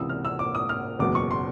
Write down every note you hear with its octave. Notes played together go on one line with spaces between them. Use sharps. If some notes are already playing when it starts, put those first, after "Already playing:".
Already playing: C#2 C3 E3 D#6 E6
F6
E6
D6
D#6
F6
F#1 E2 B2 F#3 D6
C#6
C6